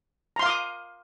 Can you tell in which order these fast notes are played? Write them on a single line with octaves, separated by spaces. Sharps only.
A#5 C6 F5 D6 D#6